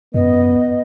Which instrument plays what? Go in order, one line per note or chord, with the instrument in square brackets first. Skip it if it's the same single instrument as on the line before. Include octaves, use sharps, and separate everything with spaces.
[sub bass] F#2 [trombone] B3 [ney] D#5